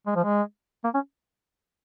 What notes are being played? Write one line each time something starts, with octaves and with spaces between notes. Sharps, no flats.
G#3
F3
G#3
A#3
C#4